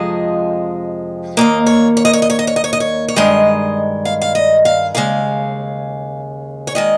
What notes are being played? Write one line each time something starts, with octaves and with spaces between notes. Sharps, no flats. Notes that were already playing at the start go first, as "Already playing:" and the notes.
Already playing: F2 C3 F3 G#3 D#5
D#2 D#3 A#3 D#5
C#5
C#5
D#5
C#5
D#5
C#5
D#5
C#5
D#5
C#5
D#5
C#5
C#5
G2 D#3 G#3 D#5
F5
F5
D#5
F5
D#2 C#3 G#3 F5
C#5
D#3 G#3 D#5